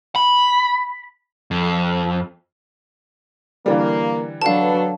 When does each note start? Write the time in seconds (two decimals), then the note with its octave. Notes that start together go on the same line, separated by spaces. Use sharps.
0.16 B5
1.51 F2
3.66 D3 E3 G3 A#3
4.42 F#3 D4 F#4 A4 B4 F5 A5